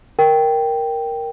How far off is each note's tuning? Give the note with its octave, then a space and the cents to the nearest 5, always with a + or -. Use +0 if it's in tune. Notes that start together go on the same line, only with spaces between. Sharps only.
A#4 +5 G5 +0